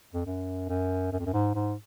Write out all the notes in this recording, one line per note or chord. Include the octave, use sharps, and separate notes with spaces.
F2
F#2
F#2
F#2
F2
F#2
G#2
G#2